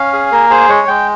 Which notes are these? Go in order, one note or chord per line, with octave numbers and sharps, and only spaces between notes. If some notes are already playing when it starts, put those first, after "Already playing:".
Already playing: C#4 F5
G#4
A#3 A#4
G#4 C5
G#3 C#5
G#3 G5